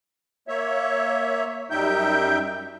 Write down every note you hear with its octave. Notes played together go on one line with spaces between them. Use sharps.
A#3 C#5 E5
F#2 G3 D#4 E5 G5 G6